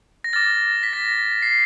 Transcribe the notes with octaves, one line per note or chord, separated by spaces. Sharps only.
A#6
D6 F6 A6
B6
A#6
C7